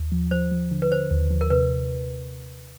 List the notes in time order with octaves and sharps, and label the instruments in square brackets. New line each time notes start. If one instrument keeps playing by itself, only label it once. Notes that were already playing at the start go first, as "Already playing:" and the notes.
Already playing: [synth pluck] D#2
F3
[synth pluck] F3 [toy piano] C5
[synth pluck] F3
D3
[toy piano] B4
[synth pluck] D3 [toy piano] C5
[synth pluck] D#2
F3
[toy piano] A#4
[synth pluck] C3 [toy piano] B4